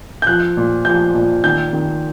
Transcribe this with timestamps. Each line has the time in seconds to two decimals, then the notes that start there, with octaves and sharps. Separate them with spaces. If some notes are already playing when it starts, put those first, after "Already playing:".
0.22 G6
0.27 F3 F#6
0.57 A#2
0.85 F3 G6
1.15 A#2
1.44 D#3 G6
1.73 D#3